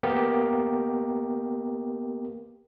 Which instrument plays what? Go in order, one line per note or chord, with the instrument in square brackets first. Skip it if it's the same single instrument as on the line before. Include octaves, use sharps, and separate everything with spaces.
[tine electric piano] A#3 B3 G4 A#4